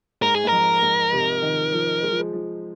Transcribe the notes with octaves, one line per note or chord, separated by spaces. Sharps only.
G#2 A#4
G#4
G#2
F2 A#4
G#2
C3
D#3
F3
G#3
F3
G#3
F3